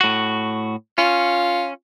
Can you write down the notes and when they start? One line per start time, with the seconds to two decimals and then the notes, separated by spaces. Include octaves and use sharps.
0.01 A2 F#4
0.98 C#4 F4